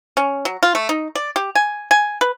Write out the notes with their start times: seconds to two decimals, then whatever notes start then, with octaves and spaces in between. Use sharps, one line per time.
0.17 C#4
0.45 F#3
0.63 F4
0.75 A3
0.89 D#4
1.15 D5
1.36 G4
1.55 G#5
1.91 G#5
2.21 B4